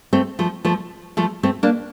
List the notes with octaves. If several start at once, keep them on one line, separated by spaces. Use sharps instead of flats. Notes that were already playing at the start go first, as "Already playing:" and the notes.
A3 C4
F3 A3
F3 A3
F3 A3
A3 C4
A#3 D4